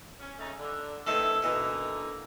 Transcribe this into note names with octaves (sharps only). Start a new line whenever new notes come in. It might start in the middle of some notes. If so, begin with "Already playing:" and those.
C#4
C#3 A3 D#4
D3
C3 D#3 A3 B3 C#4 A4
B2 D3 E3 A#3 D#4